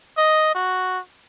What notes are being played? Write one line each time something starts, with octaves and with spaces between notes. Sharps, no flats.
D#5
F#4